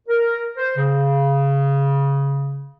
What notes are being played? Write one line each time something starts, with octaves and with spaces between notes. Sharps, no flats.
A#4
C5
C#3